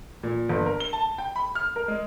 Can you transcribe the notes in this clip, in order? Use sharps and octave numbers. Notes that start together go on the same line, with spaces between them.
A#2
G1
A#4
G7
A5
G5
B5
F6
A#4
G#3